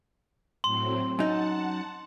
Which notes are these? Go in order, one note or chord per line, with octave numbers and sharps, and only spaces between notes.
A2 F#3 C4 C6
F#2 D#4 F#5 A5